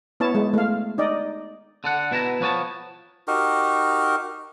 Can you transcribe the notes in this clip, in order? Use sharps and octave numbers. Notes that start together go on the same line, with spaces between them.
B3 E4 C#5 A5
G#3
A3 F5
D#4 D5 D#5
D3 A4 F#5
B2 E4 A5 A#5
F3 B3 C#5 G#5 A5
D#4 F#4 G4 A#4